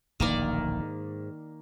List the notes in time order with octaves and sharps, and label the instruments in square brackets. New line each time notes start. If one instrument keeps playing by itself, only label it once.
[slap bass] D1 A#1 [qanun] D#3 A#3 D5
[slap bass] G#2